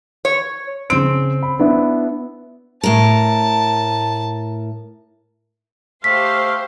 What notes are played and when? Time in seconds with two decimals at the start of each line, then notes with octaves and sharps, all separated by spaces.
0.25 C#5
0.90 C#3 C4 D7
1.43 B5
1.59 B3 D4 E4
2.83 A2 A#4 A5
6.04 A3 G4 C5 F5 C6 B6